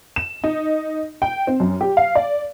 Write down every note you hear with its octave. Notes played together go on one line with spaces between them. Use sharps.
E7
D#4
G5
C4
F#2
G4
F5
D5